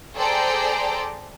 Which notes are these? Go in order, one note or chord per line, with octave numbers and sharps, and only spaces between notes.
G#4 A4 C5 D5 G5 A#5